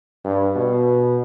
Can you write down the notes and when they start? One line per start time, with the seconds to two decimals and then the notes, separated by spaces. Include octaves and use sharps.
0.24 G2
0.56 B2